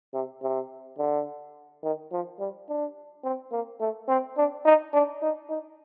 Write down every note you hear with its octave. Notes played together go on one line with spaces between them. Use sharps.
C3
C3
D3
D#3
F3
G3
D4
C4
A#3
A3
C4
D4
D#4
D4
D#4
D#4